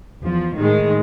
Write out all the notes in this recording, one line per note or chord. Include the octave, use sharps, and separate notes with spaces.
E2 F3
A2 D#3 G#3